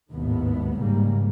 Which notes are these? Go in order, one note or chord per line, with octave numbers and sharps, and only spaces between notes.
G#1 D#2 A2 D#3 B3
G#2 C#3 G3 A#3